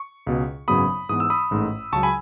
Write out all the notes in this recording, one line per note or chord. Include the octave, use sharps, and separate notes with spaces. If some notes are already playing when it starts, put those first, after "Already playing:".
Already playing: C#6
C#2 B2 G#3
G#1 F#2 C#3 F#3 B3 B5 D#6
G#2 E3 B3 D#6
E6
B5 D#6
A1 G#2 D#3 A3
C#2 C#3 F#3 A5 C#6
G#5 B5